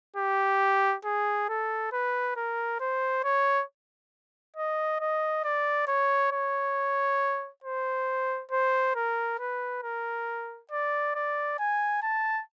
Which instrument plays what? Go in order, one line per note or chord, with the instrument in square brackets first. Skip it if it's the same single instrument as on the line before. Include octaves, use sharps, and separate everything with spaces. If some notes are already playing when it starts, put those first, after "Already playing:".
[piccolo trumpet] G4
G#4
A4
B4
A#4
C5
C#5
D#5
D#5
D5
C#5
C#5
C5
C5
A#4
B4
A#4
D5
D5
G#5
A5